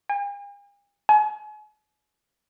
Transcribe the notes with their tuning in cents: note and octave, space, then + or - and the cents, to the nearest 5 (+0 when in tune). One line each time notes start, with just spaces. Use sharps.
G#5 -45
G#5 +40